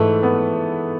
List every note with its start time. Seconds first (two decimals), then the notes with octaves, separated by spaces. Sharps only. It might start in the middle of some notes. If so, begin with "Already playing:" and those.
Already playing: G#2 E3 G#3 A3
0.23 B3